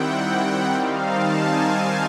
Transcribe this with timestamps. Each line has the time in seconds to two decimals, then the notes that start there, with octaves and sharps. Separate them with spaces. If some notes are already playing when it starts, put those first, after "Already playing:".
Already playing: D#3 G3 C4 E4 F#5 G5
0.74 D#3 G3 C4 D#4 F5
1.06 A5
1.35 G#5
1.65 G#5